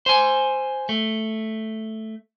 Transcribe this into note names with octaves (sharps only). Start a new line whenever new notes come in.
C5 G#5
A3